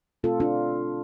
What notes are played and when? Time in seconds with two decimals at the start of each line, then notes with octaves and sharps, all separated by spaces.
0.24 B2 A3 C4 F4 A4
0.40 D4 F4